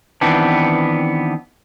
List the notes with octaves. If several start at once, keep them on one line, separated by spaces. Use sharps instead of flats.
D#3 E3 B3 C4 D4